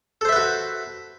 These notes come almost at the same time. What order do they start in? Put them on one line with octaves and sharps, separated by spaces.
A4 C5 E5 B4 F#4